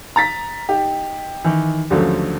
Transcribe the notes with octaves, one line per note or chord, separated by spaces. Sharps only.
A#5 A6 B6
D#4 G4
D#3 E3
D#2 D3 F3 F#3 A3 C#4